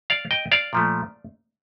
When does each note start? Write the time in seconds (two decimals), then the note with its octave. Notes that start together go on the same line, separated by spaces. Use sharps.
0.10 D5 F5
0.31 D#5 G5
0.52 D5 F5
0.73 A#2 F3 A3